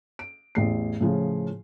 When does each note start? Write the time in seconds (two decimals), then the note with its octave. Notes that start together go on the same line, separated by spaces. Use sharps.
0.19 D7
0.55 A1 E2 C7
1.01 A2 C#3 F3